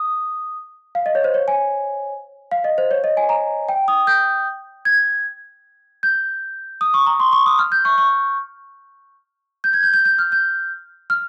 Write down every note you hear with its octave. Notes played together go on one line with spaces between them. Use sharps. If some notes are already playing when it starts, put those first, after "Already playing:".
Already playing: D#6
F5
D#5
C#5
C5
C#5
G#5
F5
D#5
C5
C#5
D#5
G#5
A#5
G5
D#6
G6
G#6
G6
D#6
C#6
A#5
C6
C#6
D#6
F6
G6
C#6
C#6
G6
G#6
G6
G6
G6
F6
G6
F6